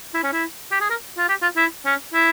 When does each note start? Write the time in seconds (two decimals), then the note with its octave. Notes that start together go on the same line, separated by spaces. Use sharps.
0.14 E4
0.24 C#4
0.32 E4
0.71 G4
0.81 G#4
0.90 A#4
1.18 F4
1.29 G4
1.42 F4
1.56 E4
1.86 C#4
2.14 E4